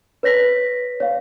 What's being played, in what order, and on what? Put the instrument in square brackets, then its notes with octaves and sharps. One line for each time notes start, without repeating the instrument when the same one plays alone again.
[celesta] B4 C#5 A#6 B6
C#5 F5